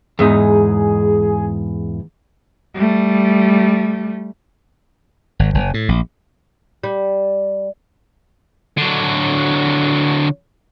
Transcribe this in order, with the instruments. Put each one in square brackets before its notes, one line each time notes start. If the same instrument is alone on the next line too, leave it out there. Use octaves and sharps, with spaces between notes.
[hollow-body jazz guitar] E2 G#2 D#4 [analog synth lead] G#4
[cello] G3 A3
[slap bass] G#1
F#1
A2
A#1
[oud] G3
[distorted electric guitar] D3 F#3